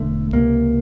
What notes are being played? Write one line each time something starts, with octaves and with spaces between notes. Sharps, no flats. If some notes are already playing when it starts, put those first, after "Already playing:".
Already playing: E1 D3 A3
C#2 C3 A#3